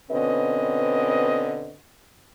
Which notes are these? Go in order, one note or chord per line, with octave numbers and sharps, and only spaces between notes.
B2 D3 C4 C#4 B4 D#5